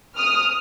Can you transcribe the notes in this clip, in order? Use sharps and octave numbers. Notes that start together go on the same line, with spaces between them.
D#6 F6